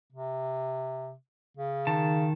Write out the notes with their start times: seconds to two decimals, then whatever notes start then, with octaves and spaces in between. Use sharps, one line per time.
0.12 C3
1.57 C#3
1.87 D#3 A5